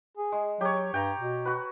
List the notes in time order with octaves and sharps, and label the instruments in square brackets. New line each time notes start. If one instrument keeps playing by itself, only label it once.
[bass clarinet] G#4
[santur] G#3
[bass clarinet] F#3 [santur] G4 C#5
[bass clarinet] G2 [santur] G5 A#5
[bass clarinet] B2
[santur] F#4 B4